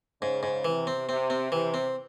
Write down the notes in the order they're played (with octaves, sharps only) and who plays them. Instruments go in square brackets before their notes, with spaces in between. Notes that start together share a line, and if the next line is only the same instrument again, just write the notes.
[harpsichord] G#2 [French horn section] C#3
[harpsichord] G#2
[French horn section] C3 [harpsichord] E3
[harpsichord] C4
[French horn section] C3 [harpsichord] C4
[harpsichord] C4
[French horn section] C3 [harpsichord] E3
[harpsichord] C4